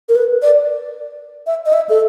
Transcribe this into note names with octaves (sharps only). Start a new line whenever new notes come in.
A#4
B4
D5
E5
D#5
E5
A4